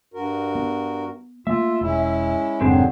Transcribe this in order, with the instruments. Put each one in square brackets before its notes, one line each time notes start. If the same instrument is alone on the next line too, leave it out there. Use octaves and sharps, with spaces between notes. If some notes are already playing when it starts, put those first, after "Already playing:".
[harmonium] G2 F#4 A#4
[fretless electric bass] B3
[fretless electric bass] A3 A#3 [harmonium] F4 [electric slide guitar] E5
[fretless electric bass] E1 [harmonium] G#3 C#4 E4
[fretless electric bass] F1 G#2 [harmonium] D3 D#3 F#3 [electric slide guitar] C4 D4 G#4